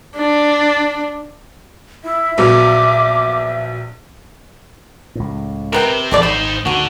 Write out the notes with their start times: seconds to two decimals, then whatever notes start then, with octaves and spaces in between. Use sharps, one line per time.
0.16 D4
2.04 E4 E5
2.38 A#1 F#3 B3 D6
5.15 C#2 A2
5.73 C3 A#4 B4 G5
6.11 G#1 E2 F3 G#3 A3 D5
6.23 G#1 D#4 C5 B5
6.65 D2 G#2 D3 F#3 F#4